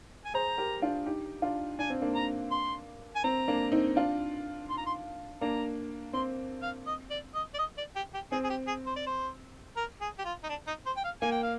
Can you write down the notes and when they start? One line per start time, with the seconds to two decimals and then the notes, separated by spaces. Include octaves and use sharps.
0.25 G#5
0.34 G#4 C5 A#5
0.58 G4 A#4
0.82 D4 F4
1.06 D#4 G4
1.42 D4 F4
1.79 D4 G#5
1.90 C4
2.02 A#3 D4
2.15 A#5
2.51 C6
3.16 G#5
3.24 C4 A#5
3.48 A#3 D4
3.72 C4 D#4
3.96 D4 F4
4.69 C6
4.78 A#5
4.86 C6
5.41 A#3 D4 A#5
6.13 C4 C6
6.62 F5
6.86 D#5
7.10 D5
7.34 D#5
7.54 D5
7.59 D#5
7.77 D5
7.96 G4
8.14 G4
8.32 C4 G#4
8.44 G#4
8.50 G4
8.67 G#4
8.86 C5
8.96 D5
9.06 C5
9.77 A#4
10.01 G#4
10.18 G4
10.25 F4
10.43 D#4
10.49 D4
10.67 D#4
10.86 C5
10.97 G5
11.04 F5
11.21 A#3 G#5
11.31 G5
11.43 F5